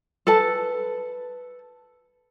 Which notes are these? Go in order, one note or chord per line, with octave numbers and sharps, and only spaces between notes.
A4 B4 A5